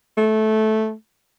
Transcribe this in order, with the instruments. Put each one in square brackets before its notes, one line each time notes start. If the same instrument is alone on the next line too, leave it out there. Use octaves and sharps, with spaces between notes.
[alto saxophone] A3